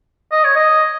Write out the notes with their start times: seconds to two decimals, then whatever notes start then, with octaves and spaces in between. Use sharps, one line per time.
0.32 D#5
0.44 C#5
0.56 D#5